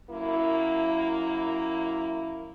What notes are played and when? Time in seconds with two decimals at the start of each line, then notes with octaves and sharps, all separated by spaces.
0.10 F#2 A#3 E4